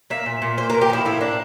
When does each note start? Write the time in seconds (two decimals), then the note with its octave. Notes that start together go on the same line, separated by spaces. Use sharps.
0.10 A#3 E5
0.26 A#2
0.42 A#2
0.57 A#3 C5
0.70 A#2 A#4
0.81 G4
0.90 F3 E4
1.05 A2 E4
1.21 A#3 D4